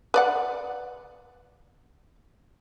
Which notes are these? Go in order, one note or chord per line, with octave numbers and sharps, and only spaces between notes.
B4 D5 F#5